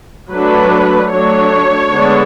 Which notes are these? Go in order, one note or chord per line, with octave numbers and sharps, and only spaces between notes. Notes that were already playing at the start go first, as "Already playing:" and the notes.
F#3 A3 D4 B4
F#3 A3 D4 C#5
D3 G#3 B3 D4